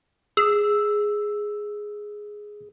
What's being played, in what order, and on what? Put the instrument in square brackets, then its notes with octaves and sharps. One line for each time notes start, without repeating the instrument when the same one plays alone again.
[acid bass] G#4 [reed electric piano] E6